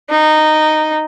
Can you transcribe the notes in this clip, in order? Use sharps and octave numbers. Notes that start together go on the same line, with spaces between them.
D#4